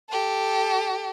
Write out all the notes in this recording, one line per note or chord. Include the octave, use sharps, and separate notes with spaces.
G4 A4